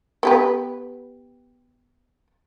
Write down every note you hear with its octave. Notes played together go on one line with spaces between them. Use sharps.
B3 G4 B4